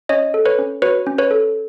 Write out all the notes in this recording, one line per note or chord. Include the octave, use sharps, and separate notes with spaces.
C#4 C#5 D#5
A4
B4 C#5
C#4
F#4 B4 C#5
C#4
B4 C#5
A4